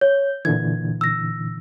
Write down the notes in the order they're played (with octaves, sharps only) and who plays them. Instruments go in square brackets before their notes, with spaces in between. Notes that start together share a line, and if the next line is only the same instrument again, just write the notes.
[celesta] C#5 [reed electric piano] G6
[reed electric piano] A#2 D3 E3 [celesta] G#6
[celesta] E6 A#6